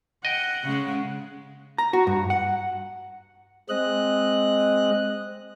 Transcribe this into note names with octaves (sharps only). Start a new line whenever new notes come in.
D#5 F#5 G5
C#3 G#3
A#5
F#4
G2
F#5
G#3 C4 D#5 F#6